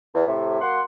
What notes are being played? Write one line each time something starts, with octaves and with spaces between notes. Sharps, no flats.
E2
A2 C3
F#3 A#3 F#5 C6